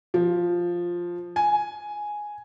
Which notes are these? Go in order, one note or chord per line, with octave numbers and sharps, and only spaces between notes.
F3
G#5